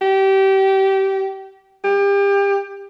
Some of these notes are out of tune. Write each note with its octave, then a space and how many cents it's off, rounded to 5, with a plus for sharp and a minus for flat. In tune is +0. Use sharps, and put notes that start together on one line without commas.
G4 -25
G4 +30